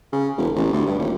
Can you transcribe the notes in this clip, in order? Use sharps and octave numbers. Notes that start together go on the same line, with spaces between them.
C#3
E1
A1
D2
G2
D#1